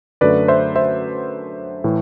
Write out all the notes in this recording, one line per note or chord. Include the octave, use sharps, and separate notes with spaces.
F#2 D3 F#3 A3 B4 D5
C5 E5
C5 E5
A2 E3 A3